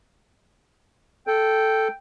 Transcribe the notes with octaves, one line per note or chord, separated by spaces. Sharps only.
A4 G5